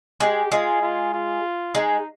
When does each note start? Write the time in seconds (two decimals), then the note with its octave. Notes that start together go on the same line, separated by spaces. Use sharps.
0.20 G#3 G4
0.52 G#3 F4
0.82 F4
1.13 F4
1.74 G#3 D#4